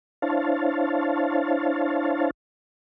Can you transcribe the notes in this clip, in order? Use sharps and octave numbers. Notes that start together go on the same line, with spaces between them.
D4 E4 C5 C#5 F5 A5